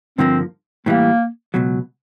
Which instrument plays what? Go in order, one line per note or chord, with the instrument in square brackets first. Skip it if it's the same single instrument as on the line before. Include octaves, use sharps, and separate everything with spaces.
[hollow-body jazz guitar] G2 D3 F3 A#3 [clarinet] C4
[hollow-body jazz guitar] A2 E3 G3 [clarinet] A#3
[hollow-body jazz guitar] C#2 B2 F#3